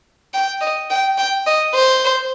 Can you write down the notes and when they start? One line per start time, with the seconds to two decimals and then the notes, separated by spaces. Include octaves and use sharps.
0.34 G5
0.61 D#5
0.90 G5
1.18 G5
1.47 D#5
1.74 C5